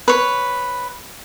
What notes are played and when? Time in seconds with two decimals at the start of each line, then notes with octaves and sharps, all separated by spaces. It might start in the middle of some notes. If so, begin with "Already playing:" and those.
0.08 B4 C#5